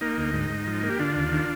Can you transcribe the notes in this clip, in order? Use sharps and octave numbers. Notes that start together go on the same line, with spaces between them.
A#3 D#4
D2
G#2
G#2
F3
A#3
G4
D3 D4 F4
D#2
D#3